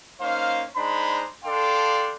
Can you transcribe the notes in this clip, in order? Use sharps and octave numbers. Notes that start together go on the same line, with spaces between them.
A#3 C#4 D#4 C5 F5
G#3 D4 D#4 C5 A#5 B5
D4 A4 D5 F5 G5 C6